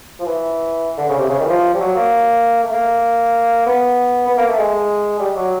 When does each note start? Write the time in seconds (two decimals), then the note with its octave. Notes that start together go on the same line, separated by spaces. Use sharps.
0.20 F3
0.26 E3
0.98 D3
1.09 C#3
1.18 C3
1.30 C#3
1.40 D#3
1.45 E3
1.49 F3
1.75 G3
1.80 F#3
1.96 A#3
2.64 A3
2.73 A#3
3.66 B3
4.28 B3
4.38 A#3
4.49 A3
4.59 G#3
5.20 G3
5.36 F#3